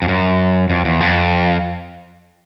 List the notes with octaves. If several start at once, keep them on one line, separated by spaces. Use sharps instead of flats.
F2
F#2
F2
E2
F2